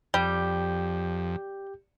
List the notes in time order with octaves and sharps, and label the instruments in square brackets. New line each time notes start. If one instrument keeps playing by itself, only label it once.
[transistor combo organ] F2 [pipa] G3 [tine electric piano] G4 G6